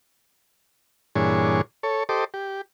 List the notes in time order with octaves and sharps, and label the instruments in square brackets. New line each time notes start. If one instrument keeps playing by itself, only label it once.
[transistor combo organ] G2 A#2 E3 D4 G#4 C#5
A4 C#5
G4 A4 C5 D#5 D6
G4